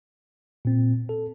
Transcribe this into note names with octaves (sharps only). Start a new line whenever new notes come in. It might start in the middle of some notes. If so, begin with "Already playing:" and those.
A#2 C4
A4